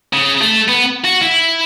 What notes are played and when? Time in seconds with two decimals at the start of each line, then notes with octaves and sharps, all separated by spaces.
0.13 C#3
0.41 A3
0.69 B3
1.05 F#4
1.22 E4